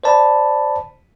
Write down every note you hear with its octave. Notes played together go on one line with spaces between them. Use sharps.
C5 D5 A5 B5